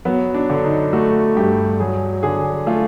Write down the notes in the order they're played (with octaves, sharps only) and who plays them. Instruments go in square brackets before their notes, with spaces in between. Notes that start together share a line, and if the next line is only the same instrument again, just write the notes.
[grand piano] F#3 [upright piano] B3
[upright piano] D4
[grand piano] D3
[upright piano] D#4
[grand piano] A3 [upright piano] F#4
[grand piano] G2 [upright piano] G4
[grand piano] F#3 [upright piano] G#4
[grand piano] D3 [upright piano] G#4
[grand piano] A3 [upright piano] F4